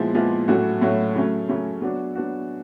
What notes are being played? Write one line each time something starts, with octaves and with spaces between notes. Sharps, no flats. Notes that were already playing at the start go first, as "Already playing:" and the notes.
Already playing: A#2 F3 G#3 B3 E4
A#2 F3 G#3 B3 E4
A2 F#3 A3 C#4 F#4
A2 F#3 A3 C#4 F#4
C#3 F#3 A3 C#4
C#3 F#3 A3 C#4
F#3 B3 D4 F#4
F#3 B3 D4 F#4